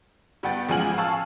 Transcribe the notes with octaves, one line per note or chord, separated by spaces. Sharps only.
G2 B3 F#5 G5 A6
A1 F3 G#3 G#5 F6 F#7
F5 G#5 A5 C#6 E6 F6